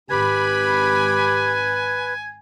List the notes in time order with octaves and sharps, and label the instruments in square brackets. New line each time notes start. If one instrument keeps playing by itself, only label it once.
[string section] G#1 B5 [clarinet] G4 [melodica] B4 [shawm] G#5